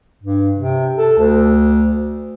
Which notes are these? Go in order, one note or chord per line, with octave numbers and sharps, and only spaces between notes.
G2
C3
A4
D2